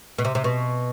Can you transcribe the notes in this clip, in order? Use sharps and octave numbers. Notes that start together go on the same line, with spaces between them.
B2
C3
C3
B2